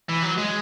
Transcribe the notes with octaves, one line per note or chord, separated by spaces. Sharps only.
E3
F#3
G#3